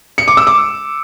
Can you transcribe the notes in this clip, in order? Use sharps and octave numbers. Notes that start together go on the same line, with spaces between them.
C#7
D6
E6
D6